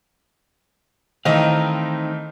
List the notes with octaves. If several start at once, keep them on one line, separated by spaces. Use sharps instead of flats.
D#3 E3 A3 C4 D#4 D#5 F5